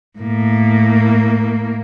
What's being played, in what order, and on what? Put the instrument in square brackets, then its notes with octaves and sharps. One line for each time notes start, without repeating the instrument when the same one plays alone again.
[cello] A2 A#3